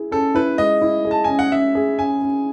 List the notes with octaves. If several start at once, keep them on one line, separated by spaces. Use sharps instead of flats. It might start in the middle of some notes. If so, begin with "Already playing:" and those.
Already playing: E4 G#4
C#4 A4
E4 B4
G#3 D#5
E4
G#4
A5
C#4 G#5
F#5
C#4 E5
G#4
C#4 G#5
C#4